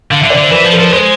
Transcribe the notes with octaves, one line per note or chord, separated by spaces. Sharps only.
D3 F5
E5
D3
D5
D3 C5
E3 B4
F3 B4
A4
F3 B4
G#3 C5